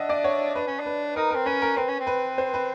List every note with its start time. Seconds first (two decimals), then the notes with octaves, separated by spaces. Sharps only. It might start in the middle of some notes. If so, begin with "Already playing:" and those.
Already playing: D4 D#5 E5 F#5
0.09 D5
0.24 C#5
0.55 D4 B4
0.67 C#4
0.80 D4
0.86 B4
1.16 D#4 A#4
1.31 C4 A#4
1.46 C#4 B4
1.62 A#4
1.77 C4 B4
1.88 C#4
2.00 C4
2.07 B4
2.38 C5
2.54 B4